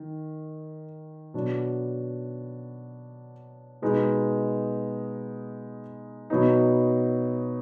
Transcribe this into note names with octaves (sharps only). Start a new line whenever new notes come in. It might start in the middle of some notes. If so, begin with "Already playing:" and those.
Already playing: D#3
B2 F#3 D4
B2 G#3 B3 D#4
B2 F#3 B3 D#4